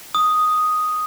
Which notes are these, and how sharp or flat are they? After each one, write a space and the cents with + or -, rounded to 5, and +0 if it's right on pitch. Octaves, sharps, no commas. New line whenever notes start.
D#6 +0